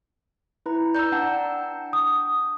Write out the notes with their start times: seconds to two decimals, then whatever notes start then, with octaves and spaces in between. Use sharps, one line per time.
0.66 E4 B4 A#5
0.95 D5 A#5 E6 G6
1.12 D4 F#5 G5 A5
1.93 D#6